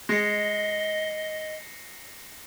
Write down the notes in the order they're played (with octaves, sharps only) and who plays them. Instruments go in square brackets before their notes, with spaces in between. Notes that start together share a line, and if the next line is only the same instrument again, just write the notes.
[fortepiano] G#3 [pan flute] D#5 [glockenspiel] A#6 C7 C#7